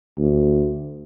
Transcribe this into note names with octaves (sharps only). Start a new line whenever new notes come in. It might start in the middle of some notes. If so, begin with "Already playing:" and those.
D2